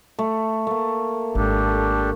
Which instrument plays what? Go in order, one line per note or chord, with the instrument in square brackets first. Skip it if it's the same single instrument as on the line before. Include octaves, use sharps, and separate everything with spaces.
[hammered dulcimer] A3
A3 A#3
[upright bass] G#1 [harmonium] D4 G4 A4